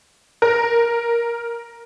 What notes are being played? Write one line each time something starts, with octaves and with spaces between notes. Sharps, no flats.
A#4